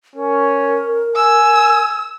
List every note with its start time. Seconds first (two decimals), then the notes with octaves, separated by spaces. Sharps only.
0.16 C#4 A#4
1.16 G#5 E6